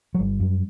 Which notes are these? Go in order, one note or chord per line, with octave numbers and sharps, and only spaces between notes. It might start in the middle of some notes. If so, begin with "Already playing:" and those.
F#3
G1 G3
F#2